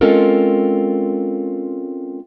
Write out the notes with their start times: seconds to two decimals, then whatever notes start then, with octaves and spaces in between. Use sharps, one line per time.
0.01 G#3 C4 C#4 F4 A4 A#4